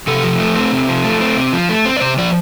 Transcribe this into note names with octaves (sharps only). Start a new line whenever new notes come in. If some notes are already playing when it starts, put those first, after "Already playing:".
C3 A4
F3
A3
C4
C3
F3
A3
C4
C3
F3
A3
C4
D5
C3 C5
F3 D5